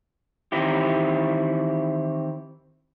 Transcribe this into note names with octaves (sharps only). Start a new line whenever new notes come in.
D#3 E3 C4 E4 G4